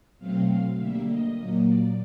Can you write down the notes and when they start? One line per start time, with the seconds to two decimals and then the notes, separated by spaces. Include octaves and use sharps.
0.19 B2 F#3 A3 C4 F5
0.48 F5
0.77 D3 G3 A#3 E5
1.07 D#5
1.36 A#2 F#3 A#3
1.66 D5